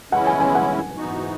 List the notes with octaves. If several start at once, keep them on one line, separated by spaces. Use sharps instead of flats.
C#3 E3 G#3 C#4 E4 F#5
G#5
G#5
F#5
G#2 E3 B3 D#4 F#4